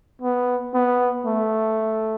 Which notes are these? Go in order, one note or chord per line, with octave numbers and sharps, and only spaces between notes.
B3
B3
A3